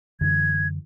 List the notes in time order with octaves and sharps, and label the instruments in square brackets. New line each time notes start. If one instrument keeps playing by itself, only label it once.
[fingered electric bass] F#2 D3 E3 [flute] G#6